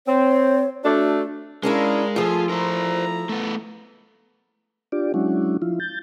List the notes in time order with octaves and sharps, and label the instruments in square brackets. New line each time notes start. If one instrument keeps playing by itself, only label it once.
[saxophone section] C4 [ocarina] C#5
[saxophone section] A3 D4 [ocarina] F#4
[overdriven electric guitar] G#3 [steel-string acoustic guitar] C#4 D4 E4 [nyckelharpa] A#4 F5
[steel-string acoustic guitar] F3 A3 [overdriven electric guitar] F4 [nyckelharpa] G#4 G#5
[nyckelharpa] E4 A#5 [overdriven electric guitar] A#4 C5
[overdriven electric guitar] A3 B3
[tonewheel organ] D4 F4 G4 D5
F#3 G#3 C#4 D4 E4 F#4
F3 E4 F4
G6 A6